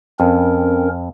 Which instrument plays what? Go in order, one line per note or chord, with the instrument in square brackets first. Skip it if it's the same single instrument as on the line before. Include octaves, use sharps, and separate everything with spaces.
[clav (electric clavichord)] F2 [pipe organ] C4 C#4 A#4